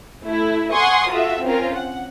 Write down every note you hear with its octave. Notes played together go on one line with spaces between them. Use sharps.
A3 E4
F#5 G#5 C6 C#6 D#6
F4 F#4 A4 E5
C4 C#4 F4 A#4
F#5